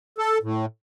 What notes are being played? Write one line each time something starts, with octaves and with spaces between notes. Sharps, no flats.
A4
A2